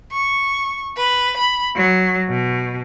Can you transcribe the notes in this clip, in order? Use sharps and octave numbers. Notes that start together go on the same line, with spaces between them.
C#6
B4
B5
F#3
B2